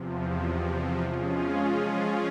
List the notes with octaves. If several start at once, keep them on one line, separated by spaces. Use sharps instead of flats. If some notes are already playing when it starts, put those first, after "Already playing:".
Already playing: E2 C3 F3
F3 G#3 C#4 F4 G#4